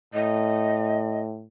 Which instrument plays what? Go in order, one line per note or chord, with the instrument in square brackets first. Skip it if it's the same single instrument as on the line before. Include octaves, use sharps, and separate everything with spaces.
[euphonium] A2 [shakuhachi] D#5